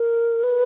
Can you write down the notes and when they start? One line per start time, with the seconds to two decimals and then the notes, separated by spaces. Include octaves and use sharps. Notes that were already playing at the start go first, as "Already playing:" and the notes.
Already playing: A#4
0.43 B4